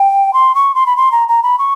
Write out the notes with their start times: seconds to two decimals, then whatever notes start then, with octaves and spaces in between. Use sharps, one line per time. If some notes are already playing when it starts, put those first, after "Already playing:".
Already playing: G5
0.33 C6
0.55 C#6
0.75 C6
0.86 B5
0.97 C6
1.12 A#5
1.28 A#5
1.43 B5
1.59 C#6